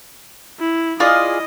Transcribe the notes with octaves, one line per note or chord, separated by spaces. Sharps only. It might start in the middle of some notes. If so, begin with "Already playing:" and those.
E4
E4 F4 G#4 D5 D#5